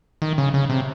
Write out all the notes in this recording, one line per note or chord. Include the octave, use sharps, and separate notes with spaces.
D#3
C#3
C#3
C3